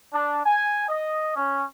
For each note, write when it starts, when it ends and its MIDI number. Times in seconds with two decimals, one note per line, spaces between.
0.12 0.39 62
0.45 0.85 80
0.88 1.32 75
1.36 1.64 61